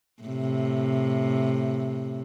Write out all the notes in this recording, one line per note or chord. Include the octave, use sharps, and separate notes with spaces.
A2 C3